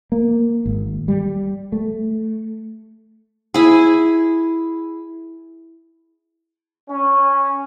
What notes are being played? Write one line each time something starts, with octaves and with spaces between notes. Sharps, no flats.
A#3
G#1
G3
A3
E4 G#4
C#4